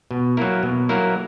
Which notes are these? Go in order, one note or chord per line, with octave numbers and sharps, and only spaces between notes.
B2
F#3 A#3 E4 A#4
B2
F#3 A#3 E4 A#4